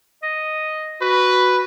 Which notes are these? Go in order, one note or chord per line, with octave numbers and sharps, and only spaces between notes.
D#5
F#4 B4